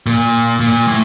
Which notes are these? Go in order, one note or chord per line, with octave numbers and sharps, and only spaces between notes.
A#2
A#2
A2